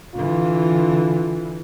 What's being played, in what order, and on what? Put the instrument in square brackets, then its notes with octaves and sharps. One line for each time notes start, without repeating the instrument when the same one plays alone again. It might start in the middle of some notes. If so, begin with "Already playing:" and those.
[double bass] D3 E3 [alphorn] F4